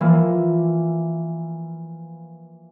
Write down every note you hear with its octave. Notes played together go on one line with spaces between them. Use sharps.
E3 F3 A#3